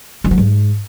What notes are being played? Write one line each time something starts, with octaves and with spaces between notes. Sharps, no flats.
F3
F#3
G#2